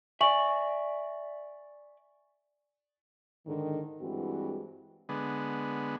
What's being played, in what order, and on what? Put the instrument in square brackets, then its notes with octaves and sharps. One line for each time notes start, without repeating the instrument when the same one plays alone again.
[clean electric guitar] D5 E5 [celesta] G#5 C#6 F#7
[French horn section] G#2 D3 D#3
G2 E3 G#3 C4 F#4
[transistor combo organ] D3 G#3 B3